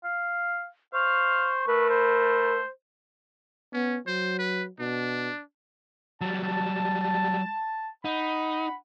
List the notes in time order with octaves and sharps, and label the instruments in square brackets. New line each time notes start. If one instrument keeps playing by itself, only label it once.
[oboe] F5
[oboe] C5 [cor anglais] F5 [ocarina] C#6
[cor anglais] A3 [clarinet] A#4 [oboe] B4
[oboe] C5 [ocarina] B5
[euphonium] B3 [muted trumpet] C#4
[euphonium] F#3 [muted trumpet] C5
[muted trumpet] B4
[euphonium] B2 [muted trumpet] D4
[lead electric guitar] F#3 G3 [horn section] A5
[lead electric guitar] D#4 [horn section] F#5 B5